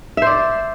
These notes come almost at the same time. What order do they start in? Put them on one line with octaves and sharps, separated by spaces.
E5 C5 D5